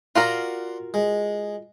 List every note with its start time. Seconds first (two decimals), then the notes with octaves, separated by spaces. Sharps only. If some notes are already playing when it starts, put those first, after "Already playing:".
0.15 F4 F#4 A#4 D5 F#5 C6
0.94 G#3